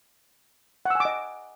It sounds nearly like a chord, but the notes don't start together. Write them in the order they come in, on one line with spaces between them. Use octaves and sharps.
F#5 E6 G#5 D6 D#5